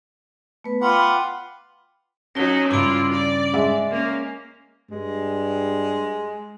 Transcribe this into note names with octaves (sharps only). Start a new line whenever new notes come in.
A3 B3 B4
F4 B4 F#5 G5 D6
F#3 C#4 D#4 A#6 G7
G2 C#3 E4 F4 D6 D7
D5
G#3 E5
A#3 C#4
G2 G#3